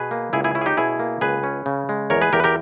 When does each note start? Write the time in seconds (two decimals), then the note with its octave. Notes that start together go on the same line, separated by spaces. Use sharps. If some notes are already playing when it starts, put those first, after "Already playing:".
Already playing: B2 G#4 B4
0.11 A#3
0.33 C#2 E4 G#4
0.44 E4 G#4
0.55 C#4 E4
0.61 G#4
0.66 D#4 G4
0.77 B2 E4 G#4
0.99 A#3
1.21 C#2 G#4 B4
1.44 C#4
1.66 C#3
1.89 G#3
2.10 E2 A#4 C#5
2.22 G#4 B4
2.33 E2 G4 A#4
2.40 B4
2.44 G4 A#4